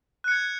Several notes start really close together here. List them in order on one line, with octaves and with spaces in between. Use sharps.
F#6 C#7 G#6